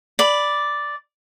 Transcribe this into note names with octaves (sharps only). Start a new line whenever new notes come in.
D5 B5